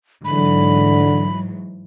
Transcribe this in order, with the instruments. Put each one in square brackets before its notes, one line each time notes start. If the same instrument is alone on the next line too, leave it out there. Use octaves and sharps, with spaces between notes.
[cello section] G#2 E3 F#3 [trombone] D3 [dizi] B5